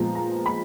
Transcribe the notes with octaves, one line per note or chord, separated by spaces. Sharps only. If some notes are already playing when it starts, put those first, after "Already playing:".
Already playing: A#2 F3 G#3 B3 A#5
A#5
B5